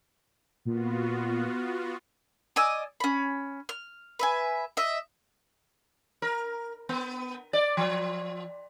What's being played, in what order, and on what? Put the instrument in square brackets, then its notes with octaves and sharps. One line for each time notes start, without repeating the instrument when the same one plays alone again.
[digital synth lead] A#2 [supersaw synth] B3 F4 F#4
[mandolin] D5 D#5 G#5 E6
C#4 B5
F6
B4 E5 G#5
D#5 E5
[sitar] A#4
B3
D5
F3